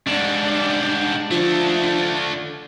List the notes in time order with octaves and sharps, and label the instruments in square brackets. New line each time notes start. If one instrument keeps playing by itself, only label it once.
[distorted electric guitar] G#2 G3 [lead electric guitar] D4
[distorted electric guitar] D3 A3 [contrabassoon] F3